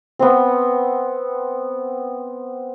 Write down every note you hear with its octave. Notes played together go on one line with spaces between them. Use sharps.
B3 C4